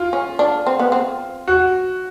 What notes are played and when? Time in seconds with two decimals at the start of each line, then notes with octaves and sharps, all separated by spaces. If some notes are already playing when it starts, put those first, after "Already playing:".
Already playing: F4
0.13 C#4
0.39 D4
0.67 C4
0.79 B3
0.92 C4
1.48 F#4